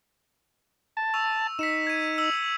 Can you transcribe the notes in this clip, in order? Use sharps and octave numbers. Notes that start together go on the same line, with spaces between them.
A5
C#6 E6 F7
D#4 B6 C#7 E7
G#6 D#7
E6 F#7